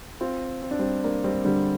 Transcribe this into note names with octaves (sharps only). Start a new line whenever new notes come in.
C4 F4
C4
D4
G3 C4
A#3 D4
G3 C4
D3 G3